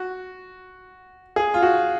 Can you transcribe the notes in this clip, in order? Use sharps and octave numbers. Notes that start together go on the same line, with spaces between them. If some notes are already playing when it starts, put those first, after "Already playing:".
Already playing: F#4
G#4
F4
F#4